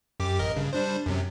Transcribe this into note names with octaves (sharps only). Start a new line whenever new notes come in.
F#2 G4 D6
A1 A#4 D#5
G2 C#3
G3 D4 C5
F#2 C3 F#3